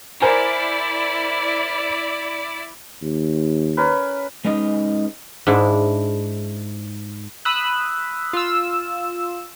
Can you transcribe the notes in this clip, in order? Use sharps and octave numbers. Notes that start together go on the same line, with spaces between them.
E4 A#4 C5 D5 G#5
D#2
C#4 A#4 B4
G#3 C#4 D#4 B4 D#5
G#2 D4 E4
B5 D#6 E6 F#6
F4 E6